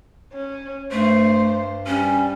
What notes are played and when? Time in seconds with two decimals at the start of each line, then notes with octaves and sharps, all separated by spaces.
0.33 C#4
0.92 G2 A3 C5
1.87 G3 C#4